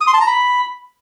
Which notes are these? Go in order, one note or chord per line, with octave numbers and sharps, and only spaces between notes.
D#6
C6
A5
A#5
B5